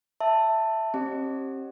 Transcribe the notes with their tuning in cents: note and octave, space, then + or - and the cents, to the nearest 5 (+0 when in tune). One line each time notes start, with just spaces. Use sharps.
E5 +0 A5 +10
C4 +40 G4 -15 D#5 -40